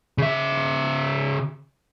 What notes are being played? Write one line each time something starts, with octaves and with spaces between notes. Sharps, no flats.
C#3 E5